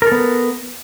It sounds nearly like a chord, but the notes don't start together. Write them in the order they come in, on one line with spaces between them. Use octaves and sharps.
A#4 A4 B3